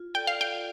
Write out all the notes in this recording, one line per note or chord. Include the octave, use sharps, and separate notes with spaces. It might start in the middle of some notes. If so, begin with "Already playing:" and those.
Already playing: F4
A4 D5 G5
F5
G5
F4